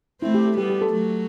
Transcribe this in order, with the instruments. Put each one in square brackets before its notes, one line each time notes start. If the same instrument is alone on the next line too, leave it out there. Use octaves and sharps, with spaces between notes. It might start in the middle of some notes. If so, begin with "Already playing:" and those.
[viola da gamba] A3 C4 [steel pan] E4
[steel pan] G4
A4
[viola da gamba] G3 B3 [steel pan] G4
[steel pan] G4
A4
[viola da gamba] F#3 A3